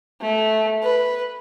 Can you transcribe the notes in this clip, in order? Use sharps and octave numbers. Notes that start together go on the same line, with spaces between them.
A3
B4